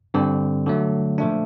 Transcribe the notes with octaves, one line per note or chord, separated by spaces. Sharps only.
G2 D3 G3 C4
D3 F#3 A3
A#2 F3 A3 D4